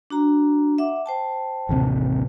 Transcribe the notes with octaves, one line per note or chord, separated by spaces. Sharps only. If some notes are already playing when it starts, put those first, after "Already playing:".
D4 F#4 A#5
E5 F#5 D6
C5 G5 A5
A1 D#2 C3